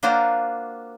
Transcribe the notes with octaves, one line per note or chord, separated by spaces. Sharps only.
A#3 D4 F4 F#4 C5